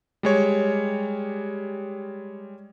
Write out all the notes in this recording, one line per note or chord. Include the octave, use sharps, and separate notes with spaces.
G3 G#3 C#5